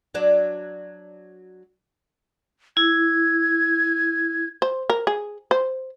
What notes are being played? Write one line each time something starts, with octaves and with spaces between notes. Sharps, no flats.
F#3 D4
E4 G#6
C5
A#4
G#4
C5